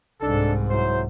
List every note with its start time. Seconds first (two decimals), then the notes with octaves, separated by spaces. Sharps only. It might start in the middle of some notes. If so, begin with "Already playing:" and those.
0.21 C2 G#2 D4 D#4 A4
0.70 F#3 E4 C5